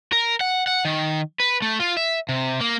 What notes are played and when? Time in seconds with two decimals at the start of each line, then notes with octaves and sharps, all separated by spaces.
0.12 A#4
0.41 F#5
0.67 F#5
0.85 D#3
1.40 B4
1.62 A3
1.80 F4
1.97 E5
2.29 C3
2.61 A#3